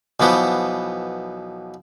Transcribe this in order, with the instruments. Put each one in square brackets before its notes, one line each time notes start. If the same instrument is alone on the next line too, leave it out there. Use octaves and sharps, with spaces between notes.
[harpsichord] B1 E3 F3 B3